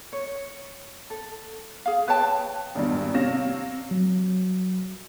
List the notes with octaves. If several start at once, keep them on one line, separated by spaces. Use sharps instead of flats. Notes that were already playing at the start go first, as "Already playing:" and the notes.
C#5
A4
G#4 F5
B4 C#5 G5 A5
G#1 E2 G2
C3 C#5 F5 A#6 E7
F#3